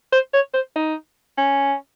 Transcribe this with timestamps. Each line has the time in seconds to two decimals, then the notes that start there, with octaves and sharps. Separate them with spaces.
0.13 C5
0.34 C#5
0.54 C5
0.76 D#4
1.38 C#4